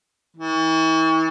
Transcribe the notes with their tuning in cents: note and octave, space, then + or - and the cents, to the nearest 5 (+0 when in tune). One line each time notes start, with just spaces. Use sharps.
E3 -40